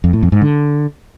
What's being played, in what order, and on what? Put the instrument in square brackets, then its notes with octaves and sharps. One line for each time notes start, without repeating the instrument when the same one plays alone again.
[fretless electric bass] F2
A2
F2
G#2
D3